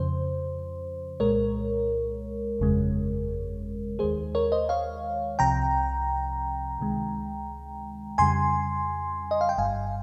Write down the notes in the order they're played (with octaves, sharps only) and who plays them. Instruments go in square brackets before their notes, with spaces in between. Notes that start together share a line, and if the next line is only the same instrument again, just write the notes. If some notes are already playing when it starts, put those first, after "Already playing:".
Already playing: [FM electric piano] F2 C#3 F3 C5
C2 A#2 G#3 A#4 C#5
G1 F2 C#3 G#3
D#2 D#3 G#3 G#4 C5
A#4 C#5
C5 D#5
C#5 F5
C2 C3 F3 G5 A#5
C#2 C3 D#3 G#3
F2 C#3 G3 G#5 C6
D#5
F5
G5
G1 G2 G3 F5 G#5